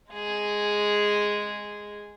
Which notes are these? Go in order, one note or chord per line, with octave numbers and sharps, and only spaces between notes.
G#3 G#4